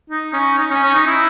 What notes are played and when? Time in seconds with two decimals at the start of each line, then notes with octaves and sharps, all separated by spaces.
0.10 D#4
0.33 C#4
0.59 D#4
0.71 C#4
0.83 C#4
0.94 D#4
1.07 E4